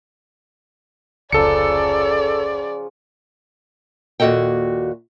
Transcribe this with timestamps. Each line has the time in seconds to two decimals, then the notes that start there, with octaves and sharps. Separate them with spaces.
1.32 F1 C#2 C#3 F3 F#3 A4 D5 C#7
4.20 D#2 A#2 F#4 A4 D#5 G5